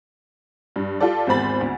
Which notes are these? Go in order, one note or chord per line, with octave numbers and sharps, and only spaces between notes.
G2
F4 G4 A4 D5
G#1 E2 C5 B5 A6
D2